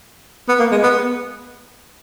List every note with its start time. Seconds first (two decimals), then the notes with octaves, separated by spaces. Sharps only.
0.48 B3
0.60 A#3
0.71 G#3
0.83 B3